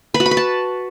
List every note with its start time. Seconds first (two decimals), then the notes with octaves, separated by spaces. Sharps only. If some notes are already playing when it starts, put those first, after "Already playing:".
0.14 B4
0.20 F#4
0.26 B5
0.31 B4
0.37 A5